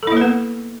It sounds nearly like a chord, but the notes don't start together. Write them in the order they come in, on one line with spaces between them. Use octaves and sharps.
A4 E4 A#3 B4 B3